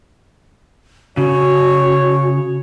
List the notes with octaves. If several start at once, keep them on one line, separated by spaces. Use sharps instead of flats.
C#3 F#4 C#5